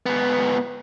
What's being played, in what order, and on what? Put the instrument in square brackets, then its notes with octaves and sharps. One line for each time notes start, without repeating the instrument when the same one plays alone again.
[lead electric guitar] G#2 B3